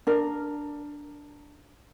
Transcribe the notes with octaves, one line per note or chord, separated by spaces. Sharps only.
D4 A#4